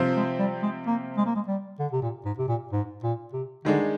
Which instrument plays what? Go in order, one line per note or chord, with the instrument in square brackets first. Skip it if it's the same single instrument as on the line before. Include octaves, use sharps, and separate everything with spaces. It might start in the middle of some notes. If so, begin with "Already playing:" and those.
Already playing: [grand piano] C3 F3 C4 F4 C5
[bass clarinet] G#3
G3
G#3
A#3
G#3
A#3
G#3
G3
D3
C3
A#2
G#2
C3
A#2
G#2
A#2
C3
[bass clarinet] D3 [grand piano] D#3 G#3 D4